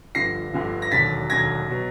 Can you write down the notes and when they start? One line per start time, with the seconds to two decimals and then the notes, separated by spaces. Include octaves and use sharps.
0.15 G1 G2 D3 F3 A#6 C7
0.53 G1 G2 D3 F3
0.82 A#6
0.91 E1 D#2 D3 F#3 A6 B6
1.30 E1 D#2 D3 F#3 G#6 A#6
1.69 B2 F#3